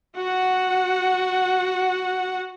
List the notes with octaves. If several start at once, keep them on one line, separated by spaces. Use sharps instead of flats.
F#4 F#5